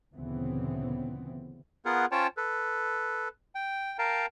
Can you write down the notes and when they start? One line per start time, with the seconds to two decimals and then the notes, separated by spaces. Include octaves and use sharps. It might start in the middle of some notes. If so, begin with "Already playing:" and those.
0.14 D2 A#2 C#3 E3 B3 C4
1.85 B3 F4 G#4 A#4 F#5
2.12 C#4 F4 C5 C#5 G5 A5
2.37 A4 B4
3.55 G5
3.99 A#4 F5 G5 A5 A#5